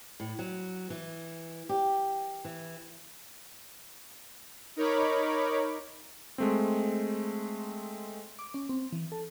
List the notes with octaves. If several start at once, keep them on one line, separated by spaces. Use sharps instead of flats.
A2
F#3
E3
G4
E3
D#4 A#4 C#5 B5 D6
G#3 A3 C4
D6
C#4
C4
E3
A4